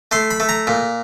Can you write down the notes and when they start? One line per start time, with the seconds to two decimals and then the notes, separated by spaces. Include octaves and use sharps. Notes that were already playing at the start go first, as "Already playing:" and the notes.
0.11 A3 C6
0.31 B5
0.40 A3
0.49 A#5
0.67 A#2